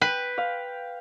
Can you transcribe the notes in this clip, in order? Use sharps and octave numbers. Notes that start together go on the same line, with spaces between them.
B4 G5
F5